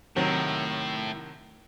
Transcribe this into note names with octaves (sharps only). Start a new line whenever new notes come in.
A2 C3 D#3 F#3